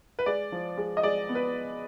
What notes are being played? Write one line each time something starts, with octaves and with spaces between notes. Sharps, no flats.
B4
G#3 D5
F3
G#3
D#5
G#3 D5
B3
B4